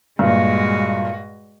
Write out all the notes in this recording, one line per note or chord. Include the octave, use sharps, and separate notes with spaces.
G2 A#2 G#3 F#4